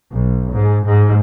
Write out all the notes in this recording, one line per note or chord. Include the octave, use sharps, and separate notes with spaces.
B1
G#2
G#2